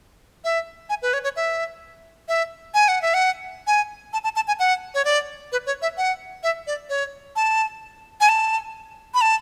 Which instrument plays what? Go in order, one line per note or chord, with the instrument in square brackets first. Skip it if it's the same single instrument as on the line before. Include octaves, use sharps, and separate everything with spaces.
[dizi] E5
G#5
B4
C#5
C#5
E5
E5
G#5
F#5
E5
F#5
G#5
A5
A5
A5
G#5
F#5
C#5
D5
B4
C#5
E5
F#5
E5
D5
C#5
A5
G#5
A5
B5
A5